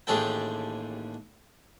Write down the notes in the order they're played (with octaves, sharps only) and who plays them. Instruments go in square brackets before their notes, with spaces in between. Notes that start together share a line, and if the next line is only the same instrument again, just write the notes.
[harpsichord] A1 D#2 D4 G#4 A4 G5